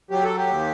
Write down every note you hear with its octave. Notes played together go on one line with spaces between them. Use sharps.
F#3 G4
A4
G4
D#2